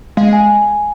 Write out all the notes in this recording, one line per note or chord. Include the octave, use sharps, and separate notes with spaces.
G#3 F5
G#5